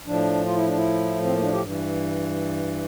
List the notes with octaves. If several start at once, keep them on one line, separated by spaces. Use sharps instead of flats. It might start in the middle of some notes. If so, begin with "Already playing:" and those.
A2 F3 D4
F4
E4
D4
E4
C4
A#3
D4
G4
G2 E3